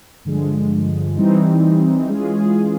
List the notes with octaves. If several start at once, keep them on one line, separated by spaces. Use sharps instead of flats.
G2 D3 F3 G#3
E3 G3 C4 D#4
E3 G#3 C#4 F4 G#4
G#4